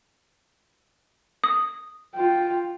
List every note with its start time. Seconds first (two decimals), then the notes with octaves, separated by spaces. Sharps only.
1.44 D#6
2.16 F4 G5